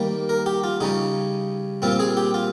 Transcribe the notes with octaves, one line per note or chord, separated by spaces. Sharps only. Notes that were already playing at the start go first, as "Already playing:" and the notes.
Already playing: D#3 G3 A#3
A#4
G4
F4
C#3 G3 C#4 D#4
A#2 G3 C4 F4
G#4
G4
F4